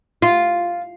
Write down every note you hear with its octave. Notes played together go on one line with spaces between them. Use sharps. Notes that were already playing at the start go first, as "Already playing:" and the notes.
F4